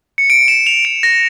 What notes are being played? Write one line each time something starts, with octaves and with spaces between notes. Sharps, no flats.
C#7
D7
E7
F7
D7
A#6